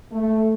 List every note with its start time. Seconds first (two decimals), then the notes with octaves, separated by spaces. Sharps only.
0.12 A3